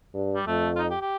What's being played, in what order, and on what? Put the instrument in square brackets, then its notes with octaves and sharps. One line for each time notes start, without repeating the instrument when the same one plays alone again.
[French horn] G2
[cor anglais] G3
[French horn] F2 [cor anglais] A3
[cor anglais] F4
D#4
G4
G4